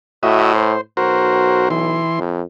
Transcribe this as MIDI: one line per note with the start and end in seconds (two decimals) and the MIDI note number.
0.23 0.77 45
0.23 0.53 66
0.23 0.53 75
0.23 0.53 76
0.55 0.81 72
0.97 2.09 35
0.97 1.69 66
0.97 1.69 70
0.97 1.69 72
1.70 2.20 52
1.70 2.20 84
2.18 2.42 41